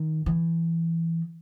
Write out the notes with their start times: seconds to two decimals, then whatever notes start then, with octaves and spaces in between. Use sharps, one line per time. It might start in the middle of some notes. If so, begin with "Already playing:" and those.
Already playing: D#3
0.26 E3